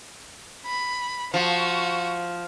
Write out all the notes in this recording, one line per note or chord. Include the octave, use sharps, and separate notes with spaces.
B5
F3 F#4